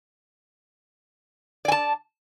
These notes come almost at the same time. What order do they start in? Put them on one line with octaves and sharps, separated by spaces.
D5 G#5 A5